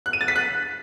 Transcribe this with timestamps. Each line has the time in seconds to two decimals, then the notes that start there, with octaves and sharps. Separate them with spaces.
0.06 F#6
0.13 D#7
0.21 A6
0.28 B6
0.36 F#6